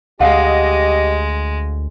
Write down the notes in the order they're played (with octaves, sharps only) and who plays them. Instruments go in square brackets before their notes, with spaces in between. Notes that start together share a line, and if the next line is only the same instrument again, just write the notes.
[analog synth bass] D2 [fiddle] G#3 [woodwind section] G4 D#5 [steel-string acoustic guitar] F5 F#5